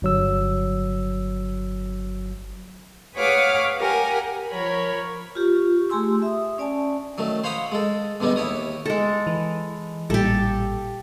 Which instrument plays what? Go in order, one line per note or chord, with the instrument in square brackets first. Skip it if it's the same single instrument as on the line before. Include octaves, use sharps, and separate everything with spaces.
[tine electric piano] G1 F#3 E6
[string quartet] G#4 B4 C#5 F5 F#5 D6
G4 A#4 F#5 G#5
[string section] F3 A#4 C#5 B5
[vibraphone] F4 G4 C#6
A3 G4 G#4 G#5 C6 E6
E5 D#6
C#4 D5 G#5 A5
[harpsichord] D#3 F#3 A3
C5 C#5 F5 F#5 B5 D#6
G#3 A4
E2 D3 G3 B3 D#4
D#2 E4 C#5 D#6
[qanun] G#3 A4
[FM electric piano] E3
[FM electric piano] A1 A#2 G3 [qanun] G4 A4